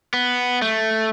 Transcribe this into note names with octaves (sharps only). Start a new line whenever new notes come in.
B3
A3